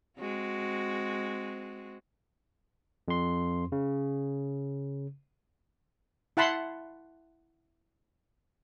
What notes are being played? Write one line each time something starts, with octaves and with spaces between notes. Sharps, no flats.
G#3 C4 F#4
F2 C6
C#3
E4 F#5 A5 B5 C6